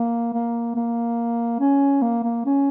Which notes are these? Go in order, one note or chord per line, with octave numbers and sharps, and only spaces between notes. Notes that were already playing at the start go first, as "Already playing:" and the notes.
Already playing: A#3
A#3
A#3
C#4
A#3
A#3
C#4